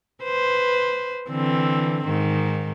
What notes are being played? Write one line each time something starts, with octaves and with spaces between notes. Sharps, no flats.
B4 C5
D3 E3 C4
G#2 D#3